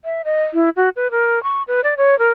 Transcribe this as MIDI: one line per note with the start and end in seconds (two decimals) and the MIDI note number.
0.05 0.22 76
0.25 0.43 75
0.54 0.70 64
0.76 0.89 66
0.96 1.11 71
1.11 1.42 70
1.43 1.63 85
1.68 1.81 71
1.84 1.94 74
1.97 2.18 73
2.19 2.31 70